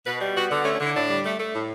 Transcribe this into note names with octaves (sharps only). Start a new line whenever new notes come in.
B2 B4
G3
B3 F#4
D3
A3 C#4
C#4
D3 E4
A2 D4
G3
A3
A3
A2